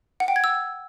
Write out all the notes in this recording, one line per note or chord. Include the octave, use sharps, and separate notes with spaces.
F#5
G5
G#6
E6